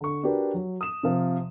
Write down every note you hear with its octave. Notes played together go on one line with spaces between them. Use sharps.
D3 C#6
D4 F#4 G4 A#4 B4
F#3
D#6 E7
C3 F3